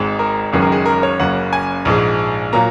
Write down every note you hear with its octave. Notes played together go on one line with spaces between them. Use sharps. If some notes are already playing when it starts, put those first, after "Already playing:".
Already playing: G#1 G#2 G#3
A#4
F#1 F#2 D#3 G#3 G#4
A#4
G#4
A#4
C#5
F#1 F#2 C#3 A#3 F#5
G#5
A#1 G#2 G#3
A#2 F#3 A#3 A#5